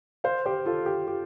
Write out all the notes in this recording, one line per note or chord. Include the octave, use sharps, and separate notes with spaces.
C5 F5
G4 C5
F4 A4
G4
G4